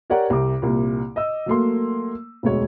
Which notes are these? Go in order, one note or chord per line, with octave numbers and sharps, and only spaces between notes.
G4 A#4 C#5 D5 F#5 A#5
C2 C3 D6
C2 A#2
D#5 E6
F#3 A3 A#3 C6
E1 D2 G#3 C#5